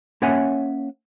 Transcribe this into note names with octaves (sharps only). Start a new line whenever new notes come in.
A#3 C#4 C#5 E5 F#5 G#5